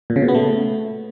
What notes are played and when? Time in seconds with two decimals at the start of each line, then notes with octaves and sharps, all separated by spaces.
0.10 A#2
0.16 C#3
0.22 B2
0.28 B3
0.35 A3